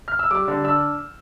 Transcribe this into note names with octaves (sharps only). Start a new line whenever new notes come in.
F6
E6
G3 D6
D3
D4 E6